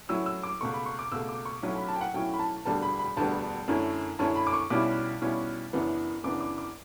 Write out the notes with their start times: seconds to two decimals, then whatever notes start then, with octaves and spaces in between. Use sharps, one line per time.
0.09 A2 F#3 C#4 E4 E6
0.26 E6
0.43 D6
0.60 C#2 B2 A3 C#6
0.74 B5
0.86 C#6
0.99 D6
1.12 C#2 B2 A3 E6
1.29 D6
1.45 C#6
1.63 B1 A2 F#3 C#4 E4
1.76 B5
1.88 A5
1.95 G5
2.01 F#5
2.14 B1 A2 F#3 C#4 E4 G5
2.34 B5
2.39 A5
2.65 E1 D2 D3 G3 B3 A5
2.82 B5
2.99 B5
3.17 E1 D2 D3 G3 B3 A5
3.68 F#2 D3 A3 C#4 E4
4.19 F#2 D3 A3 C#4 E4 A5
4.36 B5
4.47 D6
4.53 C#6
4.70 B1 B2 G3 C#4 E4 D6
5.21 B1 B2 G3 C#4 E4
5.73 F#2 C#3 E3 B3 D4
6.24 F#2 C#3 E3 B3 D4 D6
6.41 D6
6.58 D6